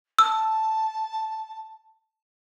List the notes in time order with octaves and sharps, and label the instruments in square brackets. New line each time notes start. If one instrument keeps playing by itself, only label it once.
[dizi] A5 [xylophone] E6